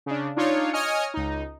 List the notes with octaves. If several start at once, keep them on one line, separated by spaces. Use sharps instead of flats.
C#3 D4
D4 D#4 F4 C#5
C#5 D#5 G#5 D#6 F6 C#7
C#2 D#4